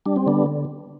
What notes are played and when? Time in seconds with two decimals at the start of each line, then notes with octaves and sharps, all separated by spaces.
0.06 G3 D4
0.16 C4
0.26 D3 B3 D4